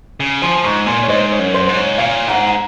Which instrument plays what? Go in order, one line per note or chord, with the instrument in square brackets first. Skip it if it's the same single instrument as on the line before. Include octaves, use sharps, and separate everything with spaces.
[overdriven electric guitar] C#3
[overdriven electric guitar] F3 [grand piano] G#5 C6
[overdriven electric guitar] G#2 [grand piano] A#5 C#6
[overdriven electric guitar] A#2 [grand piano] G#5 C6
[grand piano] C#5
[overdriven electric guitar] G#2 [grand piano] C5 D#5
[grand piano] C#5
[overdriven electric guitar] F#2
[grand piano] C5
[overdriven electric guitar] G#2
[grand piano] C#5
[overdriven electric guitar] A#2 [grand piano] C#5 F5
[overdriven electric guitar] G#2 [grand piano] F#5 A#5
[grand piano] A#5